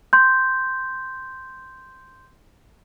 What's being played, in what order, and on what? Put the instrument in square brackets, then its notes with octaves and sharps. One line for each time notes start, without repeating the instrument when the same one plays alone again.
[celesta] C6 G6